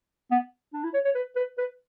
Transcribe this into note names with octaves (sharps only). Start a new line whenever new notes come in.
B3
D4
E4
C#5
C#5
B4
B4
B4